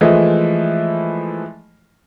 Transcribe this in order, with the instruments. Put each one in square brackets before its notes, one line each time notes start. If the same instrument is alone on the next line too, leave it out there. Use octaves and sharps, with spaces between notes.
[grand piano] E3 F3 G#3 A3 E4 D#5